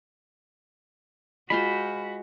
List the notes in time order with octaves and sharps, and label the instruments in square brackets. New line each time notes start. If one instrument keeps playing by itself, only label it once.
[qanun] G#3 F4 C5 [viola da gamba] F#4 [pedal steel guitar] B5